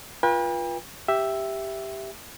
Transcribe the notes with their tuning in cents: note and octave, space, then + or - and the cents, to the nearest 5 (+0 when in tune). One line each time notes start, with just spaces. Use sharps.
F4 +0 B4 -35 G5 +45
G4 +0 E5 +0